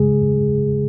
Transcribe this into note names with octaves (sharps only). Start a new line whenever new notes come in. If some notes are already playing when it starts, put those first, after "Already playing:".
Already playing: C#3 G#3 G#4